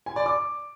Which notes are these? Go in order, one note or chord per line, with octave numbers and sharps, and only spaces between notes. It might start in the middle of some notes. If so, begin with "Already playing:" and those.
G#5
D5
D6